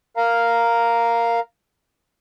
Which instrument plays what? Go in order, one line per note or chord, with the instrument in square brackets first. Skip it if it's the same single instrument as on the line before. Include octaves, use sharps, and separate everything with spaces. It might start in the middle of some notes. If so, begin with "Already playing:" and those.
[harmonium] A#4 F5 A#5